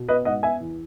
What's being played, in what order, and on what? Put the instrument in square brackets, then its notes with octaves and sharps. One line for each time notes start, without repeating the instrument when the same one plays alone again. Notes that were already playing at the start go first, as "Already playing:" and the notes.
Already playing: [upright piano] B2
B3 B4 D#5
G#2 D#5 F#5
B3 E5 G#5
E2